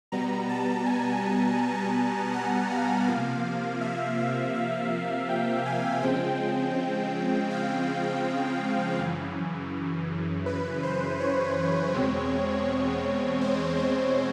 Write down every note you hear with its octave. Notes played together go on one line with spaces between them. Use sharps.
B2 G3 B3 A#5
A5
G#5
F#5
F5
C3 F3 A#3 F5
E5
F5
F5
G5
G#5
C#3 F3 G#3 C4 G5
F5
F#2 C#3 E3
B4
C5
C#5
E2 B2 G#3 C4
C5
C5